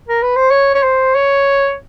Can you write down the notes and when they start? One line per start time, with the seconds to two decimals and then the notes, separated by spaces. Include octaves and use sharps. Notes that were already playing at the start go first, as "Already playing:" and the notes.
0.08 A#4
0.22 B4
0.36 C5
0.51 C#5
0.74 C#5
0.83 C5
1.15 C#5